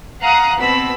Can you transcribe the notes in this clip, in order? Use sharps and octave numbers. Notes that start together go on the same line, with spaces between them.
F5 F#5 A#5 D#6 F#6
B2 C4 B5 E6